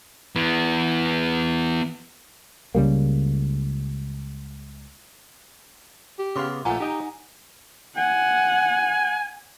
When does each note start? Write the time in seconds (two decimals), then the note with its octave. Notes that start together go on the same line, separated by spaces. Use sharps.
0.36 E3 B3
2.75 C#2 C#3 G3 A#3
6.18 G4
6.36 C#3 B3 F5 C6 D6
6.65 A#1 A3 F4 F#5 G#5 A#5
6.80 D#4 G4 D#5 G5
7.97 F#5 G#5